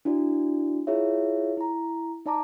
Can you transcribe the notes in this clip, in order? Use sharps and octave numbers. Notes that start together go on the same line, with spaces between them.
D4 E4 F#4 D5
E4 F4 G#4 C#5 E5
E4 A#5
D#4 D5 A5 A#5 D6